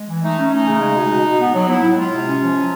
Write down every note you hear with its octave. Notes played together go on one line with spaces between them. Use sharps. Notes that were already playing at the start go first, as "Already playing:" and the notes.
Already playing: G#3
E3
A3 D#4
C#4
A3 D#4
C#3
G#3
B2
B2
B2
B3
F#3
B3 E4
A2
G#3 F4
C3
C#4
F3
F#3